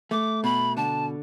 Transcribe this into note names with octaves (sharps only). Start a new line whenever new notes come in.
A3 D6
B2 B5
D3 A5